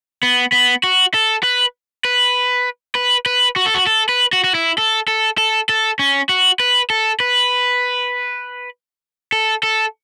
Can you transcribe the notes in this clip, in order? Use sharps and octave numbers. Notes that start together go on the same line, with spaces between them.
B3
B3
F#4
A4
B4
B4
B4
B4
F#4
A4
F#4
A4
B4
F#4
F#4
E4
A4
A4
A4
A4
C#4
F#4
B4
A4
B4
A4
A4